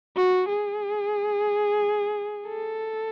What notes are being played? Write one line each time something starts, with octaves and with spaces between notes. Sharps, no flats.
F#4
G#4
A4